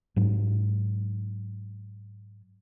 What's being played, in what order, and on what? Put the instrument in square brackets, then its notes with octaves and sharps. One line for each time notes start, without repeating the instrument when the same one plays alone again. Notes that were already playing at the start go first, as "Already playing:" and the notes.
[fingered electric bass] G#2 F#3